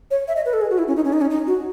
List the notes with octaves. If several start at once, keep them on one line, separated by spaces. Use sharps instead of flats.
C#5
E5
D#5
B4
A4
G#4
F#4
E4
C#4
D#4
C#4
D#4
C#4
D#4
F#4